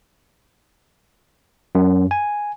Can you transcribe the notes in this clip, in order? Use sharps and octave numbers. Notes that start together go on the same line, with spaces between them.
F#2
G#5